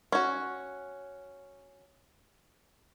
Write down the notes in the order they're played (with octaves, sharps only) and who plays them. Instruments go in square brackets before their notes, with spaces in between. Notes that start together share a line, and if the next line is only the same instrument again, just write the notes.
[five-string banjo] C#4 F#4